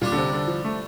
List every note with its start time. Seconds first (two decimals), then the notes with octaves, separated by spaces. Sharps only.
0.01 A#2 G3 D4 G4
0.12 D3
0.17 C3
0.33 D3
0.48 F3
0.64 A3